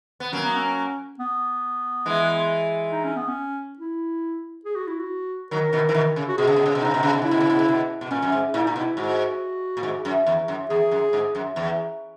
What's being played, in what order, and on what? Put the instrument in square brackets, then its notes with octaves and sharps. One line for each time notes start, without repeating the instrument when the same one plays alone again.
[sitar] B3
[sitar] F#3 A#3 [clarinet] C#4
[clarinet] B3
C#4
B3
[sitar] E3 G#3
[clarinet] D#4
C#4
B3
C#4
E4
G#4
F#4
E4
F#4
[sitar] D#3 F#3 [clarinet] A#4
[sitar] B2 D#3
E3
B2 D#3
C#3
[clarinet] F#4
[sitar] B2 [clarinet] G#4
[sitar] C#3
B2
C#3
B2
[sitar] C#3 [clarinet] D#4
[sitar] B2
C#3
B2
[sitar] C#3 [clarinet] E4
[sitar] B2
C#3
B2
C#3
B2
B2
[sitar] A#2 [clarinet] C#4
[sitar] F#2
G#2
[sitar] A#2 [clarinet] E4
[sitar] A#2 [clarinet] D#4
[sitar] B2 [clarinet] E4
[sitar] G#2 [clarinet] F#4
[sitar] A#2
G#2
F#2
E2
F#2
[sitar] E2 [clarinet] G#4
[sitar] F#2
G#2
F#2
E2